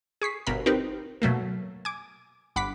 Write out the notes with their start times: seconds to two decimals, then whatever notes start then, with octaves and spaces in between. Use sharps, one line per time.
0.22 G#4 C#6 B6 C7
0.47 G1 B2 A#4 B5
0.66 C4 D#4 G4 A#4 B4
1.22 B2 F#3 A3 A#3
1.85 G#5 D6
2.56 G1 F#5 B5 D6 B6